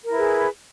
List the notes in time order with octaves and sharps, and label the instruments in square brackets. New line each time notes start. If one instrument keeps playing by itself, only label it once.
[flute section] A#4
E4
B4
G#4